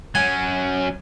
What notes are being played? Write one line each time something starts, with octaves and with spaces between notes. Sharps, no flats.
F#3 C#4 G#5